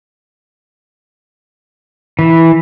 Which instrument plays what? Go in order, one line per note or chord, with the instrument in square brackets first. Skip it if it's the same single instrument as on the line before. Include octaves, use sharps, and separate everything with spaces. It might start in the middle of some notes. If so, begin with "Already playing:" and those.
[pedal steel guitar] E3